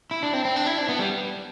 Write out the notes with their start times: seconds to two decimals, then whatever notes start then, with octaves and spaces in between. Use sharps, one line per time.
0.11 E4
0.23 D4
0.33 C4
0.45 C4
0.56 D4
0.66 E4
0.78 D4
0.89 B3
1.00 G3